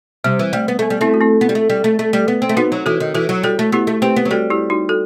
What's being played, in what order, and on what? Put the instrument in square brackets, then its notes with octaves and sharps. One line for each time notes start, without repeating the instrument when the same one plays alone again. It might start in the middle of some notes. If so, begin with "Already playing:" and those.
[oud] C3 [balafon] G3
[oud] E3
[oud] G3 [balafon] A3
[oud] B3
[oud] A3 [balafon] B3
[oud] G3
[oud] A3 [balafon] C4 E4
[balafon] F#4
C4 E4
[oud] B3
G3
A3
G3
A3
A3
G3
B3
C4
A3
[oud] B3 [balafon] D#4 F#4
[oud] F#3
[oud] E3 [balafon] F#4 A4
[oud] D#3
[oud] E3 [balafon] F#4 A4
[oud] F#3
[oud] G3 [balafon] F#4 A4
[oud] A3
[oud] B3 [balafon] E4 G4
[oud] A3
[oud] C4 [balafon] G4 B4
[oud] B3
F#3
[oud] G3 [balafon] F#4 A4
[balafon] E4 G4
D#4 F#4
F#4 A4